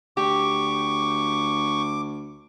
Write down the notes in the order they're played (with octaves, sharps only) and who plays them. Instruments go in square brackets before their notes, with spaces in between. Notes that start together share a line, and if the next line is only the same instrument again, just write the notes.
[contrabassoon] D2 [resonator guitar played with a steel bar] G4 [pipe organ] C#6 [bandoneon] D6